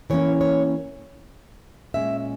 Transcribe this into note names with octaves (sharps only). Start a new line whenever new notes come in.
E3 A#3 C#4 C#5
C#5
A#2 G#3 C#4 E5